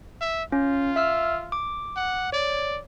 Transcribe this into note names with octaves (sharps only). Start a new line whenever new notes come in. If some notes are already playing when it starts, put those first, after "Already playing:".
E5
C#4 F4
E5 E6 F6
D6
F#5
C#5 D5